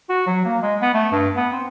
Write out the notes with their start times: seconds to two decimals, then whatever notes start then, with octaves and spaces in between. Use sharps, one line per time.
0.09 F#4
0.27 F#3
0.45 A#3
0.62 G#3
0.82 B3
0.94 A3
1.12 G2
1.36 B3
1.53 C4